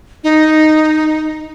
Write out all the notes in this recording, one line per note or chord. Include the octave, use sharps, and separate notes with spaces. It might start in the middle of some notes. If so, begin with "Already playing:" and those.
D#4